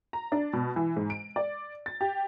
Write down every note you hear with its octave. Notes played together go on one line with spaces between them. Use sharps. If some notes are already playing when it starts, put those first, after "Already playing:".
A#5
D4
B2
E3
G#2
D7
D5
A6
G4